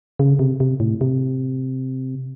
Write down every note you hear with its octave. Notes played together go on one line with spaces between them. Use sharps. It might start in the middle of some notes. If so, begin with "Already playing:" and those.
C#3
C3
C3
A2
C3